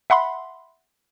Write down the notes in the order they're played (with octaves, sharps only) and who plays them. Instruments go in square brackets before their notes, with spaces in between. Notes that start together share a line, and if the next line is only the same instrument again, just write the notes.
[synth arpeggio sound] E5 F#5 B5 C6